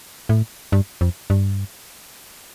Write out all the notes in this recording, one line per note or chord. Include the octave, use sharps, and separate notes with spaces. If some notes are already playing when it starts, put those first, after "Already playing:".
A2
G2
F2
G2